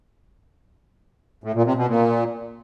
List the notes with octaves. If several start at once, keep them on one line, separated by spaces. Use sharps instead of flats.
A2
A#2
C3
B2
A#2